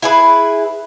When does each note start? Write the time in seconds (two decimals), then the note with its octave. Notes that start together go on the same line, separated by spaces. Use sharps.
0.02 E4 G#4 B4